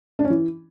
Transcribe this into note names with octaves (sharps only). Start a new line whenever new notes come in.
D4
C#4
E3